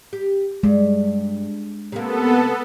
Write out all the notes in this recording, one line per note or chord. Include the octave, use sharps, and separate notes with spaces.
G4
G2 G#3
C3 A#3 B3 A4